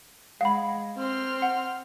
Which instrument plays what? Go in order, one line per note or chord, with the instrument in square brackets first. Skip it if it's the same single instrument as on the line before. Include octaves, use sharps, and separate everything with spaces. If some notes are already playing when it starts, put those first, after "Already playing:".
[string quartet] G#3 [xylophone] F5 F#5 B5
[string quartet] C4 C6 F6
[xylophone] F#5